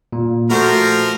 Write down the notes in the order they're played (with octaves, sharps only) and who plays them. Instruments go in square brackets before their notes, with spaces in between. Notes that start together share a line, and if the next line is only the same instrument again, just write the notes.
[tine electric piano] A#2
[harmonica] F3 A#4 C5 [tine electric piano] A3 F#4